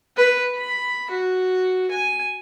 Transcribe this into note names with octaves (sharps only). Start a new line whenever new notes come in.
B4
B5
F#4
G#5